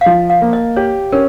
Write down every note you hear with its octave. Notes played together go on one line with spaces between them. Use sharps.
F5
F3 D#5
F5
A#3
D#5
G4 C#5
C#4 A#4